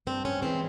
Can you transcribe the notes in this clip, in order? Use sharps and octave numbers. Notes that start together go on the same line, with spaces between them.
G2 C4
C#4
E3 G#3 C4